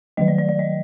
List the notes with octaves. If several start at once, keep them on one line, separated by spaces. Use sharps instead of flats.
D#3 F#3 A3 D#5
D5
D5
D5
D#5